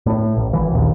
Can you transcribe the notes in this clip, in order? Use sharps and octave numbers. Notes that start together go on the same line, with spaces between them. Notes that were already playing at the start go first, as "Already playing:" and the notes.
A2
A1
G#1 E3
A#1 D#2